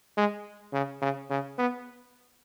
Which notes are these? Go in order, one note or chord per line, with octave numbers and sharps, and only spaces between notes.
G#3
C#3
C#3
C#3
B3